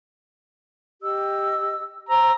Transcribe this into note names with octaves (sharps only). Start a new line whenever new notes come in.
G4 D#5 E6
C5 A#5 E6